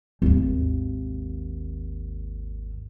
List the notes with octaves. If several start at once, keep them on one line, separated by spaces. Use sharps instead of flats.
G#1 D#2